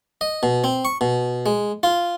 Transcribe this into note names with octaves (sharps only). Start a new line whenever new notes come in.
D#5
B2
C4
C#6
B2
G#3
F4